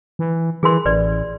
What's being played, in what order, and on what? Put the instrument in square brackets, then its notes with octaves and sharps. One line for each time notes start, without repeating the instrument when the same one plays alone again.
[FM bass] E3
[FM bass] E3 [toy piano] G#4 A#4 C6
[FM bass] A1 [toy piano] B4 D5